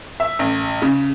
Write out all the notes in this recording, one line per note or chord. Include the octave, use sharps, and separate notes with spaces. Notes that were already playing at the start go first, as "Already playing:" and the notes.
E5
A1
C#3